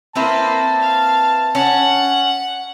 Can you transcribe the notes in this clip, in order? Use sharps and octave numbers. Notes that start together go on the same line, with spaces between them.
A#3 C4 E4 B4 C5 A5
F5
C#4 F#5